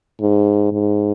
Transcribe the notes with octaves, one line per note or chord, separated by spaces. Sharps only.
G#2
G#2